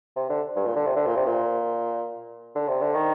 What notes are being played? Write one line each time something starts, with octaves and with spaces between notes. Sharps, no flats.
C3
D3
G2
A#2
D3
C3
D3
A#2
C3
A#2
D3
C3
D3
D#3